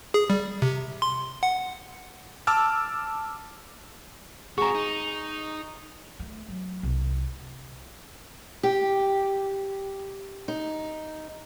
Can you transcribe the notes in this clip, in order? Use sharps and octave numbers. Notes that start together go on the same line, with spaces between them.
G#4
G3
C3
C6
F#5
A5 D6 E6 F6
C4 F#4 G#4 A#5 C#6
D#4
A3
F#3
C2
G4
D#4